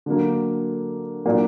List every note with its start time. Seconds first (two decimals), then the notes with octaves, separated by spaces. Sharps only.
0.06 D3 F#3 A#3
1.25 A#2 F#3 A#3 D4